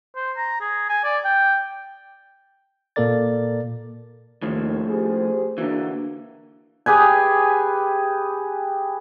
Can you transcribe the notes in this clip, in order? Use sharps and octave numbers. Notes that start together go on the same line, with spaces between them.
C5
A#5
G#4
G#5
D5
G5
A#2 A#3 A4 A#4 D5 A6
D#2 A2 F3
G4 G#4 C5
D3 E3 A#3 F#4
G4 G#4 B4 G#5